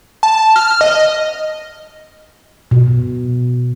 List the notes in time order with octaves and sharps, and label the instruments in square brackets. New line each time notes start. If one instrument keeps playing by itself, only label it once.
[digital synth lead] A5
F6
D#5
[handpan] B2